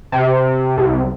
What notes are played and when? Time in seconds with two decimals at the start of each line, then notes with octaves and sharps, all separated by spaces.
0.12 C3
0.78 C2